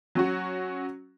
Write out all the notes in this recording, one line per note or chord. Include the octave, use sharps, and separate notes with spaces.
F#3 C#4 F#4